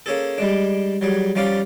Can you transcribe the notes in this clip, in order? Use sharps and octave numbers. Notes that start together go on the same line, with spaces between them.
A#3 C#4 G#4 A4
G3 G#3 D4
F#3 G3 G#4
F3 G3 C#4 D5 F5